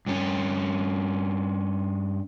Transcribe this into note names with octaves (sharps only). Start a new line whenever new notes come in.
G2 C#4